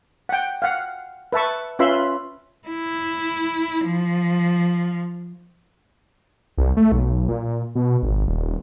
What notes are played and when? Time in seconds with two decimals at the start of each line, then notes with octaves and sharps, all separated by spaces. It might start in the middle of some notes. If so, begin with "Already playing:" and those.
0.29 F#5 G5
0.62 F5 F#5
1.33 B4 E5 A5 C#6
1.79 C#4 F4 B4 E5 B5 C6
2.68 E4
3.85 F3
6.57 C2
6.77 A3
6.92 B1
7.28 A#2
7.75 B2
8.03 G#1
8.27 D#1